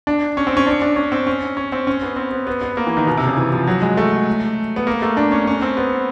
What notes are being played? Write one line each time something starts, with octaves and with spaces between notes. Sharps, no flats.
D4
C#4
C4
C#4
D4
D4
C#4
C4
C#4
C#4
C4
C#4
B3
C4
B3
B3
B3
A#3
E3
D#3
B2
C3
C#3
E3
F3
F#3
G#3
A3
B3
A#3
A3
D4
C#4
C#4
C4
B3